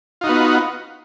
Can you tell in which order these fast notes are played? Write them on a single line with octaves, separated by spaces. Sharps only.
F4 D#4 F#4 B3